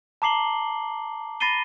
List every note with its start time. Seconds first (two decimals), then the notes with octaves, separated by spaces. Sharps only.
0.22 A5 A#5 D6 C7 F#7 G7
1.40 B5 A6 A#6 C7 D#7 G7